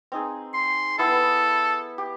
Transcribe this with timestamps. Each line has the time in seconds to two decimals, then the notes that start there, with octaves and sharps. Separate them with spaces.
0.12 C4 D#4 G#4
0.54 C6
0.98 B3 E4 A4
1.98 G4